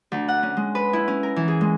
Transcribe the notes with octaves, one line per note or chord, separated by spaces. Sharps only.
D2
F#5
C#4
G#3
B4
E4
C#4
A#4
E3
G#4
G#3